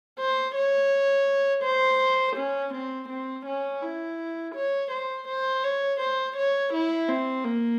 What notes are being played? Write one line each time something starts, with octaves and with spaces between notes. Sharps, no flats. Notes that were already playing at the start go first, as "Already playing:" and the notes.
C5
C#5
C5
C#4
C4
C4
C#4
E4
C#5
C5
C5
C#5
C5
C#5
E4
C4
A#3